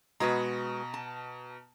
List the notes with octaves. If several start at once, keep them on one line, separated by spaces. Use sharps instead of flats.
B2 G#3 F#4 B4 A#5
A5